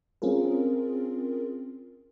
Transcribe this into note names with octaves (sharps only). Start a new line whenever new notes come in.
C4 C#4 F4 G#4 A#4